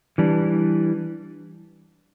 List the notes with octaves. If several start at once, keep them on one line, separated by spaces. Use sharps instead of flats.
E3 G3 D4